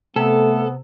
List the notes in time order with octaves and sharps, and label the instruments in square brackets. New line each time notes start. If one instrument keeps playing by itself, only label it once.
[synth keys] C3 [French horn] A3 [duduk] B3 [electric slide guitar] A4